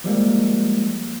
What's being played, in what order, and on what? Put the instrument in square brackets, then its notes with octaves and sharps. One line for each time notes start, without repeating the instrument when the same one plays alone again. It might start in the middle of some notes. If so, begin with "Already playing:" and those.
[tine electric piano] F3 G3 G#3 A#3